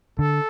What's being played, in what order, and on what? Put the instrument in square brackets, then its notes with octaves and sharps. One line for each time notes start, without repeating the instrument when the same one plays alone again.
[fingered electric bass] D3 [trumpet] A4